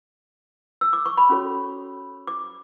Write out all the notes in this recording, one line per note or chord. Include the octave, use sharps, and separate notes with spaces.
E6
D6
C#6
B5
C#4 F#4 A4 C#5
D6